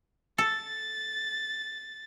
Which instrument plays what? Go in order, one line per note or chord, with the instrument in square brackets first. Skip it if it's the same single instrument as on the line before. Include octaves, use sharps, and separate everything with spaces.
[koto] A4 [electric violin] A6